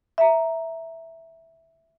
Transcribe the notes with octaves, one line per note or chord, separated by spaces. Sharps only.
E5 A#5